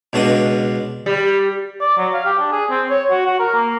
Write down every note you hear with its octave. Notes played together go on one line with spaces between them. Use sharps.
C#2 B2 D4 D#5 D#6
G3
D5
F#3
F5
G4
D4
G#4
C4
C#5
F#4
F#4
A#4
A#3